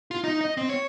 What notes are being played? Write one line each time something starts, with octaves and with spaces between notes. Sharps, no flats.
F4
D#4
D#5
C4
C#5